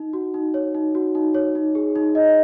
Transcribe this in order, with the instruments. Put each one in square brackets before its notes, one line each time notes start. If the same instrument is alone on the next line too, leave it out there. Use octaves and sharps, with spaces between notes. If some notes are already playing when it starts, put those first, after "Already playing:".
Already playing: [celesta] D#4
F#4
D#4
C#5
D#4
F#4
D#4
C#5
D#4
G#4
D#4
D#5